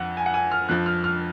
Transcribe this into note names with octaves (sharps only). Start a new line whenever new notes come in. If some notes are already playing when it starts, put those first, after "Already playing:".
Already playing: F2 F3 F#5
G#5
F#5
G#5
F6
F2 F3 F#6
F6
F6